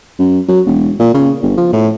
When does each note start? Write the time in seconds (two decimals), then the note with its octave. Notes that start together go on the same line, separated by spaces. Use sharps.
0.19 F#2
0.48 F#3
0.66 E1
1.00 A#2
1.14 C#3
1.42 G1
1.57 F3
1.73 A2